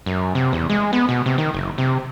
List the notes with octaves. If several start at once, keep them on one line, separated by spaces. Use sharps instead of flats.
F#2
C3
E2
G#3
B3
B2
C3
D#3
F#1
C3